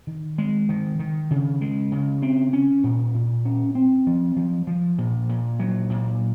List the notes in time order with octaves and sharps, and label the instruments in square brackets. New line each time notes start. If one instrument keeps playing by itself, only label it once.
[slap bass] D#3
G#3
D#3
D#3
C#3
G#3
C#3
C4
C#4
A#2
A#2
C#4
C4
F3
F3
F3
A#2
A#2
F#3
A#2